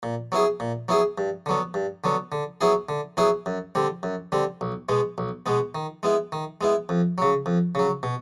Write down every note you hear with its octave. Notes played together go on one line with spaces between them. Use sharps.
A#2
F#3 B3 E4 G#4
A#2
F#3 B3 E4 G#4
G2
D3 F#3 B3
G2
D3 F#3 B3
D3
F#3 B3 E4 G#4
D3
F#3 B3 E4 G#4
F#2
D3 G3 C4
F#2
D3 G3 C4
B1
B2 G#3 B3
B1
B2 G#3 B3
D#3
G#3 B3 E4
D#3
G#3 B3 E4
F2
C#3 F#3
F2
C#3 F#3
B2